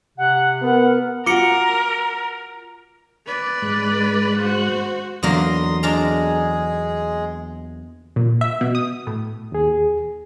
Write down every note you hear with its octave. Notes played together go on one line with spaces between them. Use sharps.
C3 F#5
B3 A#4 F#5
F4 F#4 A#4 D6 C#7
B4 D5
G#2 G#3 F#6
F#4 C5
E2 D3 E3 F#3 A#3 A#4 C6 D#6
G#3 D4 G#4 A#4 A#5
A#2
E5
B2
D#6
A2
D#2 G#4